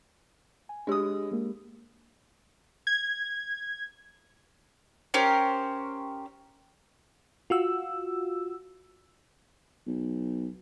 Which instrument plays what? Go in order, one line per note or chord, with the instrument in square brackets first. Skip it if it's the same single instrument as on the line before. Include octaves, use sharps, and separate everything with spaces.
[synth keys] G#5
[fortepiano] G#3 D#6 [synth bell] D4 G4
[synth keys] G#3 A#3
G#6
[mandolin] C#4 G4 A#4 C5
[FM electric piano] F4 F#4 E6
[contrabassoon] B1